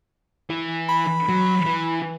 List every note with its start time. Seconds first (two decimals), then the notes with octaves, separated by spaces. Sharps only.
0.50 E3 E4
0.89 B5
1.29 F#3
1.65 E3